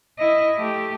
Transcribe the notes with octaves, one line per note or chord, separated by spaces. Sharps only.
E4 D#5
A3 G4